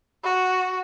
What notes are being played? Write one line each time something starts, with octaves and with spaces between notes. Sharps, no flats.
F#4